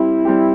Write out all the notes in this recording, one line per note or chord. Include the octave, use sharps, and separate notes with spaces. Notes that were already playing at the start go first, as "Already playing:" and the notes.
Already playing: G3 C4 E4 G4
G3 C4 G4